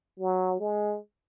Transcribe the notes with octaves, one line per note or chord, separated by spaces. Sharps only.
F#3
G#3